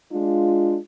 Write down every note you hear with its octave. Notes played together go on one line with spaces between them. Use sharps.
G#3 D4 F4